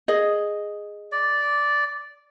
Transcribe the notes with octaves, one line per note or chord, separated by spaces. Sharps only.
G#4 D#5
D5